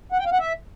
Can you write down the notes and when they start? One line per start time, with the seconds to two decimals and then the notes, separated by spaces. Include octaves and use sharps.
0.12 F#5
0.19 G5
0.26 F5
0.32 F#5
0.39 E5